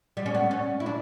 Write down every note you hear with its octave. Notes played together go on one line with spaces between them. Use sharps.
G3
C#4
B3
C#4
E4
D4